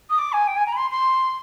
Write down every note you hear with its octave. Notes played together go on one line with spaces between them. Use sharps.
D#6
D6
G#5
G5
G#5
A#5
B5
C6
C6